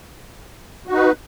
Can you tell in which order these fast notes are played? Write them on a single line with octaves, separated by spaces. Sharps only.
F#4 D#4 B4